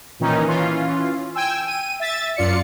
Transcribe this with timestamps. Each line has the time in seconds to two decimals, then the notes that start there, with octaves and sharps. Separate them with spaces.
0.20 A#2 D#3 E3 C#4 D#4
0.47 E3 C#4 F4
1.35 G5 G#5 E6
1.67 D#7
2.00 E5 A6
2.36 F#2 F4 D5 C#7